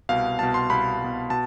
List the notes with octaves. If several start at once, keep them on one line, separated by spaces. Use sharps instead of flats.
C2 B2 F5
C2 B2 A5
C6
C2 B2 B5
C2 B2
B2 A5